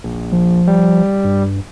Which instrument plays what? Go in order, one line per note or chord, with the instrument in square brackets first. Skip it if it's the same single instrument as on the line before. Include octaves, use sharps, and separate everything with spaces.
[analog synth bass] A#1
[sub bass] F3
[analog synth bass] G3
[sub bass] G2